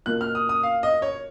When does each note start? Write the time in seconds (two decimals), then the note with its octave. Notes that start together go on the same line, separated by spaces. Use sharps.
0.06 B2 A#3 F4 F#6
0.21 F6
0.35 D#6
0.49 D#6
0.63 F5
0.83 D#5
1.02 C#5